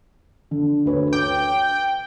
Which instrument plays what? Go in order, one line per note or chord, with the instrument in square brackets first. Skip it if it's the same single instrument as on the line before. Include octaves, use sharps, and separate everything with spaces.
[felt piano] D3
D2 B4 C#5
[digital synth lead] G5 [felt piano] D6